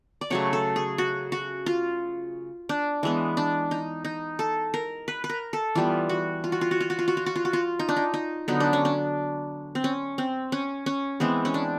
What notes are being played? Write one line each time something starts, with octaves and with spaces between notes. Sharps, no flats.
D5
C#3 F#3 A3 C#5
A4
G#4
F#4
F#4
F4
D4
E3 G#3 B3
D4
D#4
D#4
A4
A#4
B4
B4
A#4
A4
E3 G3 B3 F4
F#4
F4
F#4
F4
F#4
F4
F#4
F4
F#4
F4
F#4
F4
F#4
F4
D#4
D4
D#4
D#4
D3 F#3 B3 D#4
D4
C#4
D4
C4
C#4
C4
C#4
C#4
E3 G#3 B3 C4
C#4
D4